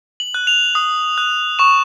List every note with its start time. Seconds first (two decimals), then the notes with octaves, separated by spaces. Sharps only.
0.20 F#7
0.34 F#6
0.47 F7
0.75 D#6
1.18 F#6
1.59 C#6 E7